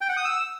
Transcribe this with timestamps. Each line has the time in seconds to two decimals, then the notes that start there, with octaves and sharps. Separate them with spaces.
0.01 G5
0.09 F#5
0.17 D#6
0.25 E6